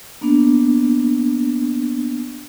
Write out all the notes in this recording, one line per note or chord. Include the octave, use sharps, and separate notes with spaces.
A#3 B3 D4